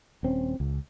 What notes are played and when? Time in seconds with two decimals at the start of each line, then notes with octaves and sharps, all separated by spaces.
0.23 D#1 C4 C#4
0.60 C#2